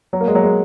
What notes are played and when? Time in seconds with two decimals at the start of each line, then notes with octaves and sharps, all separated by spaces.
0.13 F#3
0.21 A#3
0.28 G#3
0.35 F#3
0.43 G#3